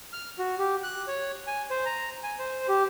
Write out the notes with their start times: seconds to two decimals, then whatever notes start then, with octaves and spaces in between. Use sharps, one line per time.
0.13 F6
0.39 F#4
0.59 G4
0.83 F#6
1.08 C#5
1.47 G#5
1.70 C5
1.85 A#5
2.23 G#5
2.39 C5
2.68 G4